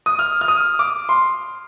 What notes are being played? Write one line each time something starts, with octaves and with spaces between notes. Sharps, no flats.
D#6
F6
F6
D#6
D6
C6